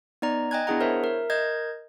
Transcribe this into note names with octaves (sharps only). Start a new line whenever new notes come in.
B3 D#4 D5 A#5
D#5 G5 G#5 F#6 G#6
B3 D4 E4 G#4 F#5 A#5
E4 A#4 C5 C#5 E5
A#4 E5
A#4 D#5 G6 G#6